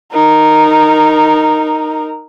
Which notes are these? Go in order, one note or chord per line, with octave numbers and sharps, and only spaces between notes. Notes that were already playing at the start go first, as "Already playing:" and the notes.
D#4 A#4